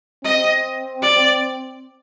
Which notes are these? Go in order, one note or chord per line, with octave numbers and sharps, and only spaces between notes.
C4 D#5
D5